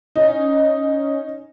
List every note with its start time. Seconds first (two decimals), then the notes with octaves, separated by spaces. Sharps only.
0.16 C#4 D#4